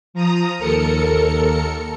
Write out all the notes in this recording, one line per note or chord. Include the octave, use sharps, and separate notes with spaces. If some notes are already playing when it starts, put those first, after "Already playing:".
F3 A#5 D#6
D#2 A4 A#4 C#7